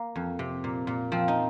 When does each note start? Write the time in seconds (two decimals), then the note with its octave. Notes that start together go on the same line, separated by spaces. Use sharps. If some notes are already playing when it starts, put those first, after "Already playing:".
Already playing: A#3
0.16 F2
0.39 C3
0.64 A#2
0.87 A#2
1.12 F3 C4
1.28 D#4